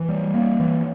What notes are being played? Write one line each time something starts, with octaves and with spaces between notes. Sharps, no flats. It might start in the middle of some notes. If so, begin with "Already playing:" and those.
Already playing: E3
G3
A#3
E3